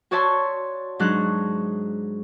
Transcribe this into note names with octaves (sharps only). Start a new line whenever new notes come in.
F#4 C#5 D5 E5 A5 C6
G#2 F#3 D4 D#4 F#6